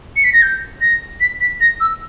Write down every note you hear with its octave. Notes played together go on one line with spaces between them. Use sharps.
C#7
B6
A#6
G6
A#6
B6
B6
A#6
E6